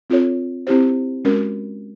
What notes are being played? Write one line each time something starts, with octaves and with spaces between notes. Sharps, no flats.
C4 F4 A4 C#5
C4 E4 G4 C5
G#3 C#4 F#4 A#4